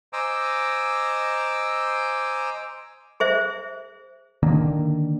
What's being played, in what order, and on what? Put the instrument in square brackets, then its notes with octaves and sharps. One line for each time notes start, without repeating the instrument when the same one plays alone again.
[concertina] C5 D#5 G#5 A#5 D6 E6
[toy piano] G#4 C5 E5
[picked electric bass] D3 D#3 A#3 D4